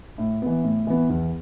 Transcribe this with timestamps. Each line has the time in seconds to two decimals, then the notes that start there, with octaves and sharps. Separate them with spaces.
0.18 A2
0.42 E3 B3
0.64 A2
0.87 E3 B3
1.09 E2